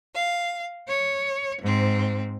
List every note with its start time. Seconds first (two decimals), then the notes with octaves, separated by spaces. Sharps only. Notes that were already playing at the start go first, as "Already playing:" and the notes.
0.14 F5
0.87 C#5
1.61 G#2 C4